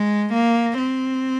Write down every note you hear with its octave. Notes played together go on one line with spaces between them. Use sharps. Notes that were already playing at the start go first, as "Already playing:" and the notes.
Already playing: G#3
A#3
C4